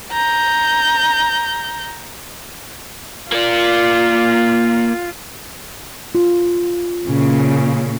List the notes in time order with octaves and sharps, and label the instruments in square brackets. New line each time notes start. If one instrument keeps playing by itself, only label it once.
[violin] A#5 G6
[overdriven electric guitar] A#3 D5 [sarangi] F4
[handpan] F4
[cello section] A#2 C#3